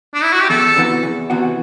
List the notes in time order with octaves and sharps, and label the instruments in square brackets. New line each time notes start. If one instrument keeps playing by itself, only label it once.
[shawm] D4
E4
F#4
G4
[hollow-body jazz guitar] E2 [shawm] A4
[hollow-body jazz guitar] C3 E3 B3 F#4
E2
C3 E3 B3 F#4